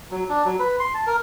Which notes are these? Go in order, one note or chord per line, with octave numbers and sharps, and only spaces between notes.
F#3
D4
F#3
B4
C6
A5
A#4